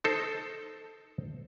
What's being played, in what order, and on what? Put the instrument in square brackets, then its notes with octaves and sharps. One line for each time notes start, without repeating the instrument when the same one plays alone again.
[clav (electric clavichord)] D#4 A4 C5